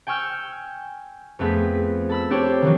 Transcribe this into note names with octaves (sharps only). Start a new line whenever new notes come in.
G5 G#5 C#6 E6 F6 G6
F2 A3 B3 C4 G#4 B6
A4 B5 E6
C4 D4 G4 C5 C#5
D#3 E3 F#3